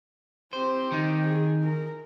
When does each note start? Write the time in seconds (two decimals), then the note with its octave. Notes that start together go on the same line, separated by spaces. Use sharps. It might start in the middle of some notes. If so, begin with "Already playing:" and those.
0.53 C4 G4 C5
0.92 D#3 D#4
1.25 G#4
1.62 A#4